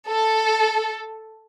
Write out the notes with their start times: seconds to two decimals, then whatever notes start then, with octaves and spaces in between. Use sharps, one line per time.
0.10 A4